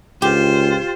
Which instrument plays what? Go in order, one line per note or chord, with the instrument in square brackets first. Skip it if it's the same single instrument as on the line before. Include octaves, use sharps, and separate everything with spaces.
[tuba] C#2 [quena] F4 [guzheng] G4 [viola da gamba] C5